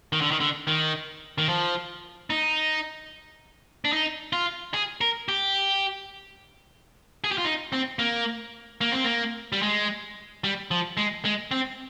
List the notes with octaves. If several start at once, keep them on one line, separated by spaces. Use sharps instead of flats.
D#3
D3
D#3
D3
D#3
D#3
F3
D#4
D4
D#4
F4
G#4
A#4
G4
G#4
G4
F4
D#4
C4
A#3
A#3
C4
A#3
G3
G#3
G3
F3
G#3
G#3
C4